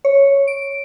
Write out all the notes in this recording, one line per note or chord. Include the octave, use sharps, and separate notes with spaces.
C#5
D7